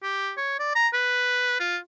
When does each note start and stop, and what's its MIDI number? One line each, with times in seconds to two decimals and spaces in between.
0.03 0.32 67
0.37 0.56 73
0.59 0.71 74
0.75 0.88 82
0.94 1.55 71
1.60 1.77 65